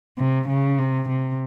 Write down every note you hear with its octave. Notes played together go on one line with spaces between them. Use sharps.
C3
C#3
C3
C3